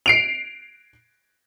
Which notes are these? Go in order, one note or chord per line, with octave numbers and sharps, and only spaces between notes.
C7 D7 F7